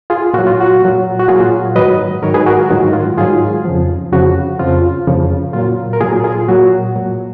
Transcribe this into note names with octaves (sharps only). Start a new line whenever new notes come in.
F4 G#4
A#2 F#3 F#4
F4
F#4
A#2 F#3
F#4
A#2 F#3 F4 G#4
G#2 D#3 F#3 B4 D#5
G#2 D#3 F#3 A#4 C#5
G#4 B4
F#4 A#4
F4 G#4
G#2 D#3 F#3 F#4
F4
G#2 D#3 F#3 F4 G#4
F2 C#3 F3
F2 C#3 F3 F#4
F2 C#3 F3 F4
F2 C#3 F3
A#2 F#3 F4
A#4
A#2 F#3 F4 G#4
F4 G#4
A#2 F#3 F#4
A#2 F#3